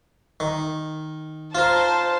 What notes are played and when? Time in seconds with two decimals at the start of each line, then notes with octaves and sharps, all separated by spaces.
0.40 D#3
1.55 F4 A#4 C5 A5